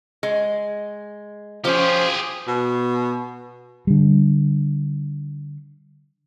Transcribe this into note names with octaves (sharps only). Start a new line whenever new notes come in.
G#3
F3 C#4 G4 G#4 C5
B2
D3 G3